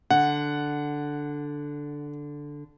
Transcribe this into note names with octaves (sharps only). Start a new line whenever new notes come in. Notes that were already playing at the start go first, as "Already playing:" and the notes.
D3 F#5